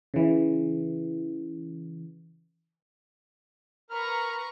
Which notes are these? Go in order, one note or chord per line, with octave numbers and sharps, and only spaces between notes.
C#3 E3
A#4 B4 A#5 C#6 F6